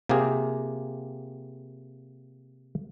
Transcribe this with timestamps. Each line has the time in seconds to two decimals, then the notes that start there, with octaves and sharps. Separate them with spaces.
0.09 C3 A#3 F4 G4 G#4